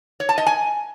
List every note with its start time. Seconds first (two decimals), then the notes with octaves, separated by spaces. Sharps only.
0.20 C#5
0.29 A5
0.38 D#5
0.46 G#5